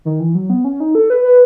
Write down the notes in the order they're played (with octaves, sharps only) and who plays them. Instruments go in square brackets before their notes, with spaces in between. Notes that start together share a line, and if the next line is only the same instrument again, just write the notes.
[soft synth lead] D#3
E3
F#3
B3
C#4
D#4
A4
B4
B4